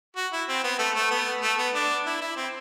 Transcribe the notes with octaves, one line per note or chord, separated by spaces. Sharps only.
F#4
E4
C4
B3
A3
A3
B3
A3
B3
D4
E4
E4
C4